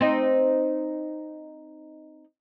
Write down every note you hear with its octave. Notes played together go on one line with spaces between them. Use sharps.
C4 D#4